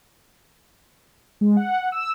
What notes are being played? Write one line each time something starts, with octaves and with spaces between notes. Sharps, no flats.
G#3
F#5
E6